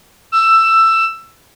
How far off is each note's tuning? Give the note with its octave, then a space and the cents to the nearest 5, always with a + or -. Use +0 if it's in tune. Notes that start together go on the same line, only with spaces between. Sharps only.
E6 +15